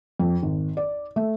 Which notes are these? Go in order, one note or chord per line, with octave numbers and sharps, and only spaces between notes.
F2
G#1
D5
A3